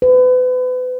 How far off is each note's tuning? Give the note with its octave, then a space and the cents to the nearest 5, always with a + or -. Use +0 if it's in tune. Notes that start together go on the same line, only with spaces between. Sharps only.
B4 +35